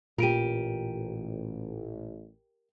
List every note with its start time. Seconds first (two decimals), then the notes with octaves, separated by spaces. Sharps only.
0.18 A1 A#2 F4 G4 A#4 D7 D#7